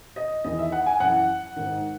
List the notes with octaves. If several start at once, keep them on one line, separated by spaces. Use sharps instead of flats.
D#5
E2 D#3 D#5
E5
F#5
G#5
F#2 E3 F#5
G#2 D#3